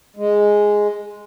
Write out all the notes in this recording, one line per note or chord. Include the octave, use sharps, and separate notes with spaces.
G#3